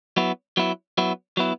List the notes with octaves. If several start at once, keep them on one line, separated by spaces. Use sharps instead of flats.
F#3 B3 E4
F#3 B3 E4
F#3 B3 E4
F#3 B3 E4